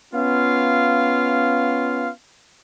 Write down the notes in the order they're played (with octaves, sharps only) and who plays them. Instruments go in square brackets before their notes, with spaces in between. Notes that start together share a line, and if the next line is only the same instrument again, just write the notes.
[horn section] B3 C#4 F4 F5